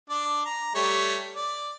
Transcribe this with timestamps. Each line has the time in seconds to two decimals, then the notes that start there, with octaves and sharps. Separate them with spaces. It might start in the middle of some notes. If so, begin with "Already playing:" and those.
0.10 D4 D5
0.45 A#5
0.75 G3 A3 C#5
1.36 D5